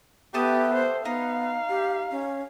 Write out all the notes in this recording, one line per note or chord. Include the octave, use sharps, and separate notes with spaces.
A3 B3 G4 A5 D#6
C5
B3 D#4 F5
G4
C#4